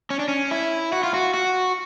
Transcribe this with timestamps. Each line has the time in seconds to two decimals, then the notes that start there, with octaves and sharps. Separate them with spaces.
0.10 C#4
0.19 D4
0.28 C#4
0.51 E4
0.93 F#4
1.03 F4
1.14 F#4
1.34 F#4